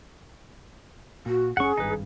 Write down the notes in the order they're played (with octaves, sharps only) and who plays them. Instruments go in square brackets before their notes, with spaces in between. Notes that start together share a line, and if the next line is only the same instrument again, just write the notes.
[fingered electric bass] A#2 [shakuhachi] F#4
[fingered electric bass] F#1 C3 C#4 [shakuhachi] G#4 [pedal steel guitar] F#5 C#6
[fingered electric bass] G#1 G2 [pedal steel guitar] D#4 B4